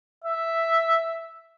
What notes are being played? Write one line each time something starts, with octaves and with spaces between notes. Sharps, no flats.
E5